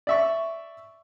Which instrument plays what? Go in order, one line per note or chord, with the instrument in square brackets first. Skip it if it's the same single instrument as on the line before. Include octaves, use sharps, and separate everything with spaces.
[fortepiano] D5 E5 C#6